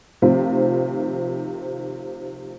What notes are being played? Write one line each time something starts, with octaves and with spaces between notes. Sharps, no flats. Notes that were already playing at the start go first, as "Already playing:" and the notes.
A2 C3 D#3 F3 C4 F4